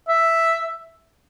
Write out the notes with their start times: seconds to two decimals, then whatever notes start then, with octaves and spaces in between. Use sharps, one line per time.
0.08 E5